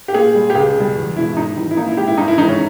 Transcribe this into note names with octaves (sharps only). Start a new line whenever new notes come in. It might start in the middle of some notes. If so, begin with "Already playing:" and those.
G4
A#2 G#4
G3
G4
C#2 G#4
B2 G3
E2
B2 G#3 E4
E4
G#2 D#4
E3 G3
E4
A#2 D#4
E4
G#3 G4
E4
G2 D#4
E4
E3 G#3 D#4
C#4